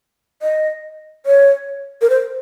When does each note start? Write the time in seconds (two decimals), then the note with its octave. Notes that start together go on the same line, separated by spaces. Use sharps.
0.42 D#5
1.26 C#5
2.02 A#4
2.10 C5